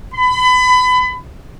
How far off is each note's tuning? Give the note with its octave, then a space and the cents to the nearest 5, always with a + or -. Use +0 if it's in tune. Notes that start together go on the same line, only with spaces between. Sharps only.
B5 +30